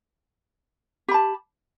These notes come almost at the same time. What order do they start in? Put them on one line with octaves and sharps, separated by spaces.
G4 B5 A5